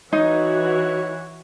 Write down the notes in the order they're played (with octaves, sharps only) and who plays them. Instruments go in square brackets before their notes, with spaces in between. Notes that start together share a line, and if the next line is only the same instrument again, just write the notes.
[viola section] E3 F#4 [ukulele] D#4 [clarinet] C#5